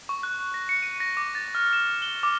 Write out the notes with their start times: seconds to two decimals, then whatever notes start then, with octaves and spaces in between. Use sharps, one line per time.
0.09 C#6
0.23 F#6
0.54 A#6
0.69 C#7
0.83 D#7
1.00 A#6
1.17 D6
1.35 A6
1.55 F6
1.73 E7
2.02 G7
2.23 D6